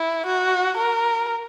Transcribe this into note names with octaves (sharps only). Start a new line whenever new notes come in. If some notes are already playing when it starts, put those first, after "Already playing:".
Already playing: E4
F#4
A#4